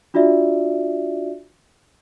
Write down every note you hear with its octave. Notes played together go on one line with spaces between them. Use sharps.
D4 F4 F#4 D5 E5